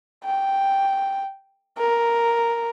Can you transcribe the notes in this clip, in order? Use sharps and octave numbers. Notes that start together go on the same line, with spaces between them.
G5
A#4